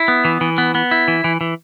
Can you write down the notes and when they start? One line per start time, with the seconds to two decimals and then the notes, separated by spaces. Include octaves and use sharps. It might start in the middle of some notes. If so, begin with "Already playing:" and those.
Already playing: E4
0.08 B3
0.25 E3
0.41 E3
0.58 B3
0.75 B3
0.91 E4
1.08 E3
1.24 E3
1.41 E3